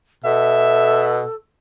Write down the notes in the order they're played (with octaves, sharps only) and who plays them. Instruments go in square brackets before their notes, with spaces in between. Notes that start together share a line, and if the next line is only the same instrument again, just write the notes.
[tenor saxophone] B2 [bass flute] A4 [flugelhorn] E5